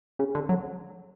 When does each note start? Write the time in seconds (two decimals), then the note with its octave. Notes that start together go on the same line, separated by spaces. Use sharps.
0.19 C#3
0.35 D3
0.49 F#3